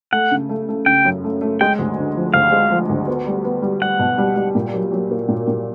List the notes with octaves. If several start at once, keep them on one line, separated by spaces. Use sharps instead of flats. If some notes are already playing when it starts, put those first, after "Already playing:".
A3 F#5
C#3
A3
A3
C#3 G5
F#2
A3
A3
G#3 G5
D2
D3
F3
D2 F5
G#3
F3
D2
B3
G3
B3
G3
G3 F#5
B2
G3
G3
A#2
F#3
F#3
A#3
A#2
A#2